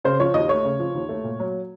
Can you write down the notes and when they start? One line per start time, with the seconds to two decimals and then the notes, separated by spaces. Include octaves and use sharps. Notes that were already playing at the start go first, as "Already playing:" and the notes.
0.04 C#3 C5
0.20 F3 C#5
0.34 D#2 D#5
0.49 A3 C#5
0.64 C#3
0.80 F3
0.95 D#2
1.09 A3
1.24 A#2
1.40 F#3